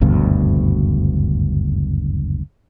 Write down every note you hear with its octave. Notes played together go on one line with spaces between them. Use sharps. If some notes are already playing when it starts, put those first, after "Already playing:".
F#1 D2 G2 B2